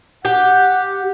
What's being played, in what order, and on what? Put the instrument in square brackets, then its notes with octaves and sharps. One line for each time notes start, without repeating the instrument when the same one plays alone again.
[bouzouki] G4 [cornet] F#5